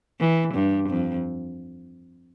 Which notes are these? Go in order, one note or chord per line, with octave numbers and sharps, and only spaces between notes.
E3
G2
F2